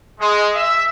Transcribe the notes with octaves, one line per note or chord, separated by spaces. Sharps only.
G#3
E5